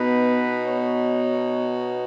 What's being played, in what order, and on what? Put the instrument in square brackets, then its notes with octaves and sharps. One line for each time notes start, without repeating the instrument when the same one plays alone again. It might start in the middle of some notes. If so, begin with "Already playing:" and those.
Already playing: [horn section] B2 B3 D#4 B4
C#5